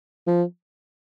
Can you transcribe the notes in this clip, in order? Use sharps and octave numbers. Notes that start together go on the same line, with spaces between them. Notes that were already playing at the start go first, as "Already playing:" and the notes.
F3